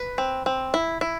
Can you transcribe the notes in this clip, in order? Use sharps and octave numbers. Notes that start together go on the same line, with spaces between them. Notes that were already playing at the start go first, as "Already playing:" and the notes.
Already playing: B4
C4
C4
E4
E4